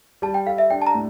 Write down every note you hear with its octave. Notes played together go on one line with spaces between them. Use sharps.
G3 A5
G5
A4 F5
E5
D4 G5
A5
A#5
A2